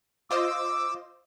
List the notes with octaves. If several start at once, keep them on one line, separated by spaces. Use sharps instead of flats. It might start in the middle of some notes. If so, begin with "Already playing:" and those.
F4 C5 D#5 D6 E6